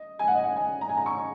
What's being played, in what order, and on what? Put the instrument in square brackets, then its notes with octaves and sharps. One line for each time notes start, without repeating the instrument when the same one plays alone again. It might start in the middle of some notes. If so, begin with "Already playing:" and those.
Already playing: [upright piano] D#5
G#5
F#5
D#5
F#5
G#5
A#5
G#5
A#5
C#6